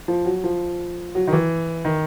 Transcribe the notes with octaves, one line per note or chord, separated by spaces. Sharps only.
F3
F#3
F3
F#3
D#3
E3
D#3